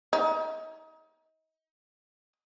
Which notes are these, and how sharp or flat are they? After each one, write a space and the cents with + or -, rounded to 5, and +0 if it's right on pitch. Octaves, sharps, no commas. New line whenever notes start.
D#4 +35